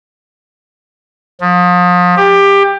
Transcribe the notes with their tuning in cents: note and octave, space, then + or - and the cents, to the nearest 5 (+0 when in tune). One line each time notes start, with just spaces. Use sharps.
F3 +35
G4 +20